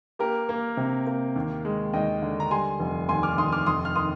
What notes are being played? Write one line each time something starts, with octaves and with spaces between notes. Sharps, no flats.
A#3 G4 A#4
A#3
C3
A#3
D#2
G#3
D#2 D#5 G5
D3
A#5
G3 G#5 C6
F1
D#2 G#5 C6
D6 F6
D#2 C6 D#6
D6 F6
F1 C6 D#6
F6
D#3 C6 D#6